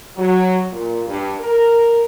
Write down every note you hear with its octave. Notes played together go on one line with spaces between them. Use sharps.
F#3
A#2
G2
A#4